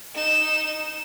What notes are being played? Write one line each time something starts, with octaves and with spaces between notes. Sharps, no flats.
D#4 E7